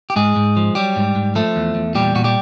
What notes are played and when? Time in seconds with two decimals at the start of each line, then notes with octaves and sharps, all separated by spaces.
0.10 G4
0.16 G#2 G#3 G#4
0.36 G#2
0.57 F3
0.75 F#3 G3 G4
0.96 G#2
1.16 G#2
1.35 F3 A3 A4
1.56 E2
1.75 E2
1.95 A#2 G3 G4
2.15 A#2 F#4
2.24 G3 G4